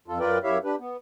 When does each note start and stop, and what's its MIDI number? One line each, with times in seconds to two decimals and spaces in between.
0.08 0.19 41
0.08 0.19 65
0.08 0.19 69
0.20 0.38 42
0.20 0.38 65
0.20 0.38 70
0.20 0.38 71
0.20 0.38 74
0.20 0.38 79
0.43 0.58 42
0.43 0.58 64
0.43 0.58 67
0.43 0.58 73
0.43 0.58 76
0.43 0.58 77
0.64 0.75 62
0.64 0.75 67
0.64 0.75 71
0.79 0.97 59